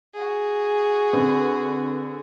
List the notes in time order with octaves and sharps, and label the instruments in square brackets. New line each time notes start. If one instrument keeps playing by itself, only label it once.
[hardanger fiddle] F#4 G#4
[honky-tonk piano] D3 C4 B4